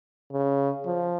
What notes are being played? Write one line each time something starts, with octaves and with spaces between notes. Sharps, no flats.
C#3
F3